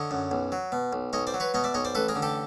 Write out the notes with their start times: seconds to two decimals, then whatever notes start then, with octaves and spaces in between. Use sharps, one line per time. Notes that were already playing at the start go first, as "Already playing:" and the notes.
Already playing: D3 C#5 D#5
0.11 F#2
0.31 B1
0.52 F#3
0.72 B2
0.93 B1
1.13 B1 C#5 D#5
1.27 C5 D5
1.34 F#3
1.40 B4 C#5
1.54 B2 C#5 D#5
1.64 D5 E5
1.74 B1 C#5 D#5
1.85 C5 D5
1.95 A1 A4 B4
2.09 G#4 A#4
2.15 D3
2.22 G4 A4